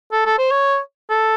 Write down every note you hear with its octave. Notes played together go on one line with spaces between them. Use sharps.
A4
A4
C5
C#5
A4